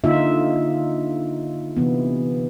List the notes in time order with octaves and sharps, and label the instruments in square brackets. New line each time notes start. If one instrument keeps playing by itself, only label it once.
[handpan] D3 A#3 D#4 F4 E5
C3 E3 B3